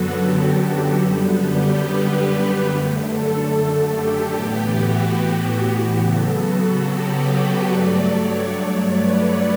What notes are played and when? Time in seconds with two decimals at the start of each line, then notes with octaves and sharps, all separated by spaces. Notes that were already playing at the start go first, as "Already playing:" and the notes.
Already playing: F#2 D3 F#3 B3 F#4 A4
0.14 G4
0.97 F#2 D3 G3 B3
1.39 G4
1.81 B4
2.23 G4
2.64 F#2 D3 A3
3.06 A4
3.89 G4
4.31 A2 E3 B3 G4
4.73 F#4
5.14 G4
5.98 C#3 F#3 B3 A4
6.40 F#4
6.81 G4
7.24 B4
7.65 G2 F#3 A3 D5
8.07 C#5
8.49 C#5
8.91 B4